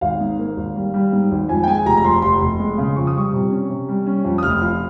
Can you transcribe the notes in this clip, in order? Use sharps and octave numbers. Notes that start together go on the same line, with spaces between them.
G#1 F5
G#2
A#3
G#1
G3
G3
G#2
G#1
F2 G#5
G5
G#3 G#5
F1 A#5
A#5
F2 C6
F1 C6
F1
G#3
C#3
F2 C#6
D#6
G3 C#6
C3
C#4
C3
G3
C#4
F2
D#6
F1 F6
F3